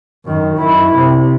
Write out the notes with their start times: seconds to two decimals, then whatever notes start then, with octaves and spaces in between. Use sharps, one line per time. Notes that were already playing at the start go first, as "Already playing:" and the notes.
0.25 F#2 D#3
0.56 F#2 E4
0.95 C3